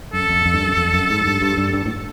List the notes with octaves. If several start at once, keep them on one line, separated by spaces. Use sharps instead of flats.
F#2 A4
F2
F2
G2
F#2
F2
F#2
G#2
G2
G2
G2
G2
A2